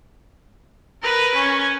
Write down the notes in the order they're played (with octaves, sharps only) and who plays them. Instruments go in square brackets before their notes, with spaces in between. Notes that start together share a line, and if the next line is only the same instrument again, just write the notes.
[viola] A#4 B4
C#4